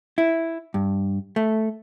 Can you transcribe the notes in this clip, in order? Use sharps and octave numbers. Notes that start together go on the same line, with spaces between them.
E4
G2
A3